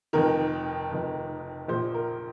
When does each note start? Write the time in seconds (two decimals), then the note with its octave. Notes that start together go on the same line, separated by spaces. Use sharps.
0.13 F1 F2 D#3 A#4
0.91 F1 F2 D#3
1.68 A#1 A#2 F3 C5
1.94 A#4